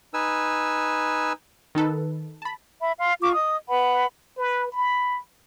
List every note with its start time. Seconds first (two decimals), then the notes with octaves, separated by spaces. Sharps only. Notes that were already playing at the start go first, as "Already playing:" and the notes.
0.14 D#4 B4 G#5 E6
1.75 D#3 D#4 A4 B4
2.42 A5 B5
2.81 E5 B5
2.99 F5 C6
3.21 F4 C#6 D6
3.35 D#5 D#6
3.69 B4 F#5 B5
4.38 B4
4.72 B5